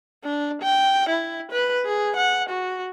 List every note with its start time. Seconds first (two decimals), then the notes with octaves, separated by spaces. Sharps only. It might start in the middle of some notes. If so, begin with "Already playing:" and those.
0.24 D4
0.62 G5
1.09 E4
1.52 B4
1.86 G#4
2.17 F#5
2.50 F#4